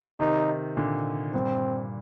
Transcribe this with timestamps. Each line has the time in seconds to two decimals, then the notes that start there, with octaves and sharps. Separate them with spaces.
0.20 C3 D#3 D#4
0.77 A#2 D3
1.33 G2 A#2 C4